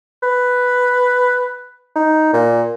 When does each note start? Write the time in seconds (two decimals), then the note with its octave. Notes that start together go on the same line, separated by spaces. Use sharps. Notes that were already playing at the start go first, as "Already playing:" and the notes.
0.23 B4
1.95 D#4
2.33 A#2